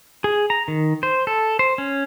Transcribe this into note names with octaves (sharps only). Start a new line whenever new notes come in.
G#4
A#5
D#3
C5
A4
C5
C#4